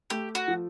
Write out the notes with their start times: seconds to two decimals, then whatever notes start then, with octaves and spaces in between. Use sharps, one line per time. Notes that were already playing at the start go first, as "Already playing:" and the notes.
0.10 A3 G4
0.35 F#4
0.48 F3